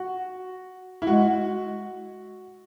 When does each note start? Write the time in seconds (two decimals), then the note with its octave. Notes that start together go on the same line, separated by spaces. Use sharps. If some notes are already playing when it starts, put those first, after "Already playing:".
Already playing: F#4
1.02 E4
1.07 G#3 F#4